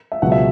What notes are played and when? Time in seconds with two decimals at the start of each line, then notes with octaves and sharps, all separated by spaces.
0.12 E5
0.22 C#2 B2 F#3 F#5
0.32 E5